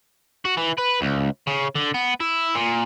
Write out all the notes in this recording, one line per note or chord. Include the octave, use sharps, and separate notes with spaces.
F#4
E3
B4
C#2
C#3
D3
B3
E4
A#2